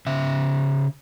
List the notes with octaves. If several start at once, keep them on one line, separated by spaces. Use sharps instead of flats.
C#3 E5